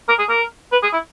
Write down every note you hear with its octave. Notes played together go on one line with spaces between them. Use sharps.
A#4
G#4
A#4
B4
G#4
E4